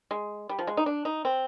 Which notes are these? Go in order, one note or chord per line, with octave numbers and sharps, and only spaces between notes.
G#3
G3
F3
G#3
D#4
D4
D#4
C4